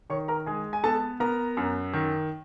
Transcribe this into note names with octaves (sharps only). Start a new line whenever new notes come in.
D#3 C#5 C#6
A#4 A#5
G#3 G#4 G#5
G#5
B3 A4 A5
B3 A#4 A#5
F#2
D#3